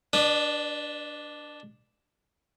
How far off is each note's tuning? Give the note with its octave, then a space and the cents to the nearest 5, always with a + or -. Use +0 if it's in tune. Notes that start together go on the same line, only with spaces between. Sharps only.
D4 -5 B4 +0 D5 +45